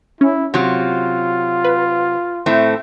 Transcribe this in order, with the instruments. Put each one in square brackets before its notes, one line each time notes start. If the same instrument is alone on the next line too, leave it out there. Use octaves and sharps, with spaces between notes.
[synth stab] C#4 [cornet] E4
[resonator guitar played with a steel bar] C3 F#3 [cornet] F4
[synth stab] B4
[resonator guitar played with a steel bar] A2 A3 C4